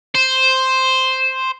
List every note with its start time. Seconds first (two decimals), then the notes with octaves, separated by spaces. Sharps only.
0.15 C5